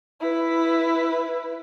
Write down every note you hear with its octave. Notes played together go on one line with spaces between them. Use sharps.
E4 B4